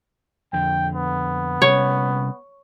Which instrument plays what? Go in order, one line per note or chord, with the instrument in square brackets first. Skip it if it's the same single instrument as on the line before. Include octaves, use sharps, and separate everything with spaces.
[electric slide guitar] F2 D3 [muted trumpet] G5
[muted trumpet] B3
[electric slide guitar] C3 G3 C#4 [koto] C#5